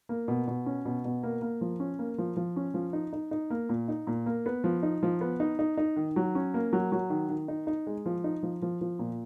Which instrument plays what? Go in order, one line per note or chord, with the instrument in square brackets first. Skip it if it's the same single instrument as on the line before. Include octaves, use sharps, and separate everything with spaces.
[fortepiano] A#3
B2
B2
C#4
B2
B2
A#3
A#3
F3
C#4
A#3
F3
F3
C#4
F3
D#4
D#4
D#4
A#3
A#2
D#4
A#2
A#3
B3
F3
D#4
F3
B3
D#4
D#4
D#4
D#3
F#3
C#4
A#3
F#3
F#3
D#3
D#3
D#4
D#4
G#3
F3
D#4
F3
F3
F3
A#2